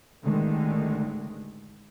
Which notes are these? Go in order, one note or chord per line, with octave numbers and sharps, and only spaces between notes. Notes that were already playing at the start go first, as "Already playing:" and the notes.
A1 D3 D#3 G#3